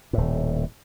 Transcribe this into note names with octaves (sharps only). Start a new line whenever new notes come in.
D#1 A2